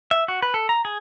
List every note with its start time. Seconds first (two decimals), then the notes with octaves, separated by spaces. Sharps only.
0.11 E5
0.28 F#4
0.42 B4
0.54 A4
0.69 A#5
0.85 G#4